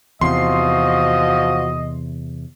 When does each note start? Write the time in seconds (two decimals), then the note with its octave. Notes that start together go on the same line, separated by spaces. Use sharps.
0.21 E2 C3 F3 F#4 D#5 C6